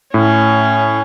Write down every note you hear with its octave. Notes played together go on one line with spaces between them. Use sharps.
A2 C#4